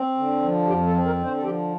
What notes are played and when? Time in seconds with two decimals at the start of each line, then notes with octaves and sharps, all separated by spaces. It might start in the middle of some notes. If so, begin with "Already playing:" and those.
Already playing: C4
0.17 D3
0.42 F3
0.67 F2 G4
0.86 A4
0.92 C4
1.05 A#4
1.18 D3
1.24 C5
1.37 A4
1.42 F3 G4